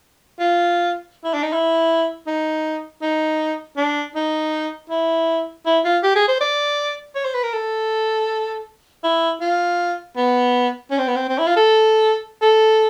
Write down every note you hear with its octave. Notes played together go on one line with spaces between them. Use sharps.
F4
E4
D4
D#4
E4
D#4
D#4
D4
D#4
E4
E4
F4
G4
G#4
C5
D5
C#5
C5
B4
A#4
A4
E4
F4
B3
C#4
C4
B3
C4
C4
E4
F4
A4
A4